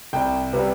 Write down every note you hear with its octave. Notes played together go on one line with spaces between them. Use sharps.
C2 G5
C3 G3 B3